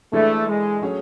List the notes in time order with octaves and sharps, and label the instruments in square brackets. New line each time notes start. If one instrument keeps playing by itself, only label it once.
[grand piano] E3 G#3 D4 A4 [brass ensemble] A3
[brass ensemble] G#3
[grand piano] F#3 A3 C#4 G#4